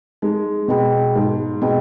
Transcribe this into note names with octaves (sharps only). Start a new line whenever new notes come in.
G#3 D#4
B2 G#4 D#5 G5 B5
G#2 D#4
B2 G#4 D#5 G5 B5